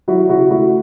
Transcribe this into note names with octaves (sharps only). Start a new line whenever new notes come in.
F#3 E4 F#4
C#3 E4 F#4
A3 E4 F#4